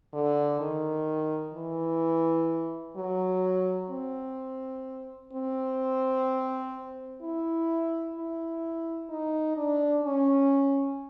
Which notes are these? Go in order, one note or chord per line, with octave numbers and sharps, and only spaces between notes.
D3
D#3
E3
F#3
C4
C4
E4
E4
D#4
D4
C#4